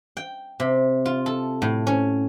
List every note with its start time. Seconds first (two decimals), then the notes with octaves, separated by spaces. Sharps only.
0.17 G5
0.60 C3
1.06 F4
1.26 A4
1.62 A2
1.87 C#4